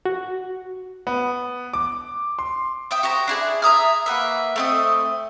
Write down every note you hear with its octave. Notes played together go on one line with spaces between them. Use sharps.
F#4
B3
D6
C6
E5 G5 D#6
F#4 G4 C5 A#5
D4 E4 G#4
E5 A#5 D#6 F6
A#3 F#4 B4 E5
A3 C4 D#5